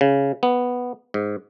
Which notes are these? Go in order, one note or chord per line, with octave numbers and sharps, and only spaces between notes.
C#3
B3
G#2